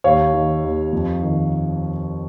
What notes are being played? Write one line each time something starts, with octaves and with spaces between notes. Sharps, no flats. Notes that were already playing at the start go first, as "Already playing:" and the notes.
D#2 C#5 F5
D#3
D#2
F2
D#3